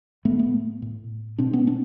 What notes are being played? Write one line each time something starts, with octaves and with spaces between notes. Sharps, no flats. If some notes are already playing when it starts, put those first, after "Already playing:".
A2 A3 B3
A3 B3
A2
B2 C4 D4
B3 C#4
C4 D4